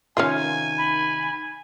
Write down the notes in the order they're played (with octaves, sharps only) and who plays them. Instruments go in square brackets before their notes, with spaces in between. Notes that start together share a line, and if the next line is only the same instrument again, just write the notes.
[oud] C3 D#3 F5 [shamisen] C#4 F4 [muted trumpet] G#5
[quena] B5